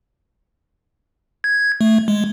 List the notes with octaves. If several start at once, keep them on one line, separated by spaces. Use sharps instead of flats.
G#6
A3
G#3